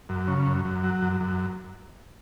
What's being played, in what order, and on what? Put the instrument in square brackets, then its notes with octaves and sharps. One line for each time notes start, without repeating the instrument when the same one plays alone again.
[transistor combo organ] F#2
C#3
F#2
F#2
F#3
F#2
F#2